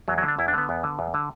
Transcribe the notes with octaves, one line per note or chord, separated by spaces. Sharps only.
E2 F#3
F#3
D3
D4
E2 E4
D4
D3 B3
E2
D3
E2
D3